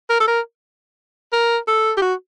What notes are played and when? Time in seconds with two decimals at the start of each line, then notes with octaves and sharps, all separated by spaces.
0.10 A#4
0.21 A4
0.28 A#4
1.33 A#4
1.68 A4
1.97 G4
2.02 F#4